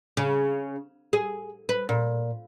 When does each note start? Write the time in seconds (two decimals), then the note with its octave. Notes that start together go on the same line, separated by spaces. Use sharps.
0.17 C#3
1.13 G#4
1.69 B4
1.89 A#2